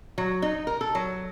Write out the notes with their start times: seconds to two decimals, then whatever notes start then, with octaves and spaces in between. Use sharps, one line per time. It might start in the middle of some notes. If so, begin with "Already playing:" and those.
0.18 F#3
0.42 D#4
0.67 A#4
0.81 A4
0.95 F#3